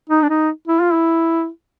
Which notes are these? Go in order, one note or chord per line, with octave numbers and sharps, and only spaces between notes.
D#4
D4
D#4
E4
F4
E4